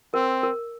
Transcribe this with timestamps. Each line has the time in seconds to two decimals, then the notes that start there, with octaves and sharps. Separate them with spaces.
0.14 C4 A#4
0.43 A#4